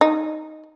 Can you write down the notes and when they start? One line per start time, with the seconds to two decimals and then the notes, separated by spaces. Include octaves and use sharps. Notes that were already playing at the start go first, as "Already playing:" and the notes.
0.01 D#4